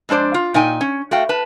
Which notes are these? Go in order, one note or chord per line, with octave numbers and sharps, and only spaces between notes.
F2 G#3 D4 C5 D5
F4
A#2 D#4 G5 G#5
C#4
A3 F#4 F5 G5
B4 A5